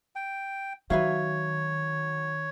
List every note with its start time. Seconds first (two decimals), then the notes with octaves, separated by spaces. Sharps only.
0.16 G5
0.90 D#3 F#3 B4 C#5 E5 F5